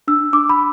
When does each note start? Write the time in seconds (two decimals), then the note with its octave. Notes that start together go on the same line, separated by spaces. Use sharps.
0.07 D4 E6
0.33 D4 D6
0.49 B5